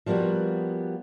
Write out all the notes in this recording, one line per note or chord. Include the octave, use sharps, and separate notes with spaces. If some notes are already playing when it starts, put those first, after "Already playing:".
F3 G3 A#3 B3 F#4